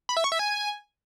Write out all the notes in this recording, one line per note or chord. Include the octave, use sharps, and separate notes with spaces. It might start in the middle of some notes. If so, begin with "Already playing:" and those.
B5
E5
C#6
E5
G#5